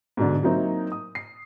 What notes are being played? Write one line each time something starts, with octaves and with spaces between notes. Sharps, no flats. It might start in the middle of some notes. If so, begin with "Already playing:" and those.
G#2 B2 D3
F#3 A#3 C4 D#4 E4
D#6
C7